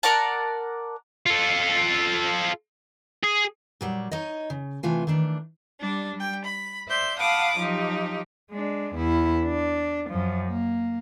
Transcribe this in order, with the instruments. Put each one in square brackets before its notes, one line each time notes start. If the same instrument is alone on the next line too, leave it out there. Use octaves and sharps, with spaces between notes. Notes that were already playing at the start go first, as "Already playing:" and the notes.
[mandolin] A#4 D5 F#5 A5
[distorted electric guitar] F4 A4
G#4
[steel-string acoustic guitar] A#2 F#3 G3
D#4 C#5 D#5
C#3
C3 E3 A3 F4 G#5
D#3 E3 A3 D4
[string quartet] G3 D4
G3 G5
B5
C5 D5 E5 G6
F5 F#5 A5 B5 D6 D#6
F3 F#3 D#4 G4
[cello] G#3 D4
E2 E4
D4
F#2 F3
A#3